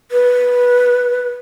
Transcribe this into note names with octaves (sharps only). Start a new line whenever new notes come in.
B4